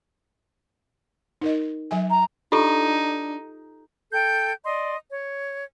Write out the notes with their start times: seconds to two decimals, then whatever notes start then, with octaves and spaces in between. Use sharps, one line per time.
1.42 D#4 A#4 D#5
1.91 F#3 E5 G#5
2.10 A#5
2.52 D4 D#4 F4 G4 A4
4.12 A4 G5 G6
4.65 D5 D#5 C6
5.10 C#5